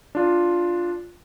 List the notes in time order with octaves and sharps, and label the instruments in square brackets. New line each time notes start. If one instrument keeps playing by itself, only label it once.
[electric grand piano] D4 F4